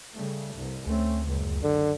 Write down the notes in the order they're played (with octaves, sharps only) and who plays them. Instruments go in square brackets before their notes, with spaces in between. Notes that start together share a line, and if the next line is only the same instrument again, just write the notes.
[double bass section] C#3 G3 A3
C2 G2
[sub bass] D2 [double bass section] A3 C4 C#4
[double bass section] F#1 C#2 F#2
[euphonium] D3